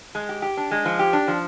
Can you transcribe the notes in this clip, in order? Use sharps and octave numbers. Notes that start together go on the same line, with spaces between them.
G#3
G4
G4
D4
G#3
F3
G4
D4
F3